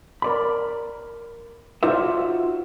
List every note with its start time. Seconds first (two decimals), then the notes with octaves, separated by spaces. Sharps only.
0.22 A#4 D5 B5
1.83 D#4 F4 F#4 C5 D5 E5